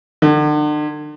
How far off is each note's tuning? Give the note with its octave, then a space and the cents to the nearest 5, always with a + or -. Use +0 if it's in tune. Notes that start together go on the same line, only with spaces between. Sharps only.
D3 +40